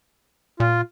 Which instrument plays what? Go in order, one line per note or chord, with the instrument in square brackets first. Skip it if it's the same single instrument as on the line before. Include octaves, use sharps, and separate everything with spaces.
[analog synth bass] A#2 [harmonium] F4